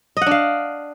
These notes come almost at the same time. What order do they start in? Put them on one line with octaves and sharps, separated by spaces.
D#5 F#5 D4 F5